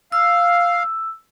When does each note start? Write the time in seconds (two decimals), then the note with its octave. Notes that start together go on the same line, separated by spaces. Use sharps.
0.12 F5 E6